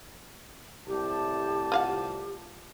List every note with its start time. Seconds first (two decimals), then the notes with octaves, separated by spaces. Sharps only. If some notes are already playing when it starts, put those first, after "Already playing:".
0.88 C2 A2 G4 A5
1.72 F4 F5 F#5